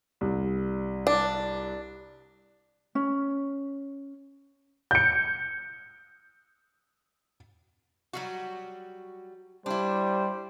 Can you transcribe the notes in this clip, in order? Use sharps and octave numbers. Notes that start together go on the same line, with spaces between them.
C2
D4
C#4
G6 C#7
F#3 G3 F#4
G3 D4 E4 C5